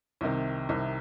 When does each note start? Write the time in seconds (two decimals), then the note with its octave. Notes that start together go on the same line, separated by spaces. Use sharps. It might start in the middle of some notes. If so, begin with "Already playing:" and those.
0.21 C2 C3 D#3
0.69 C2 C3 D#3